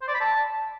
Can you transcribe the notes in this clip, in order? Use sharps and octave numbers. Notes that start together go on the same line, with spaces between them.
C5
D5
B5
A5